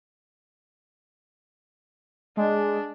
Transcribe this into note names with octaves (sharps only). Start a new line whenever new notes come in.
G#3 D4